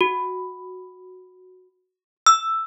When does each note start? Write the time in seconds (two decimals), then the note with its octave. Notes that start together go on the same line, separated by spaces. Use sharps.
0.01 F#4
2.26 E6